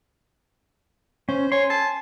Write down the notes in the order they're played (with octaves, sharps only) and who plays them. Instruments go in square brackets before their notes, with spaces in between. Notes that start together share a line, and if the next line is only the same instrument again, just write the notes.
[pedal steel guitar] C#4 [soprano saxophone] C5
[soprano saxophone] C#5 [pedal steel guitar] G#5 C6
[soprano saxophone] A5